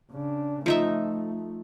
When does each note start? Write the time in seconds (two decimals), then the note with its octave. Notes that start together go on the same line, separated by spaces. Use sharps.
0.11 C#3 D4
0.66 F3 A3 D#4 E5